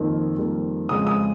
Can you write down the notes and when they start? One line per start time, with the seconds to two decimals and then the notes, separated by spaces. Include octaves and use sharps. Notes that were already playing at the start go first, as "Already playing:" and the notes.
Already playing: F2 D#3 A#3
0.37 F2 D#3 G3 A#3
0.89 F2 C#3 G#3 D#6
1.07 D#6